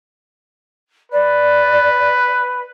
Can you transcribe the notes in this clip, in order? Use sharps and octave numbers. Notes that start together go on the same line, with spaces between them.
B4 D5